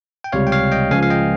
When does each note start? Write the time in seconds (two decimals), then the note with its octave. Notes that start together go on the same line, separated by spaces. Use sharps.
0.24 G5
0.32 C#2 C3 G3 C#5 F5
0.47 G5
0.52 C#5 F5
0.72 D#5 G5
0.91 C#2 C#3 F3 F5 G#5
1.03 F5
1.10 D#5 G5